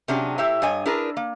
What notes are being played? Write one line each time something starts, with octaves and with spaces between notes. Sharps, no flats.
C3 F#3 C#4 D4 G4 G#4
A2 E4 G4 E5
G2 C#5 D#5 G#5
D4 E4 G#4 A#4 B4 D5
A#3